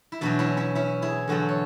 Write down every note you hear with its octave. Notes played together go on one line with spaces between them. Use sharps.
E4
E2 B2 F#3 D4 F#4
C#4 E4
C#4 E4
C#4 E4
E4 G#4
E2 D3 F#3 F#4 A4
C#5